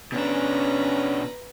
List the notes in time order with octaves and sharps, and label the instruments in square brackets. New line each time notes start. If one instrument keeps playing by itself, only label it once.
[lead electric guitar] B2 D4 [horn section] C#4 [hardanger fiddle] B4 A#5